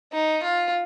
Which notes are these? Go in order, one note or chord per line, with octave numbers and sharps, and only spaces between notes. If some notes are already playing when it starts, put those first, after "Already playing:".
D#4
F4